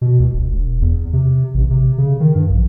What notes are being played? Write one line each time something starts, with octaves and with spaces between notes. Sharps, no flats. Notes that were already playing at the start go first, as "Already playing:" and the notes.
B2
C#2
E1
E1
E2
C3
A1
C3
C#3
D#3
G2
A#1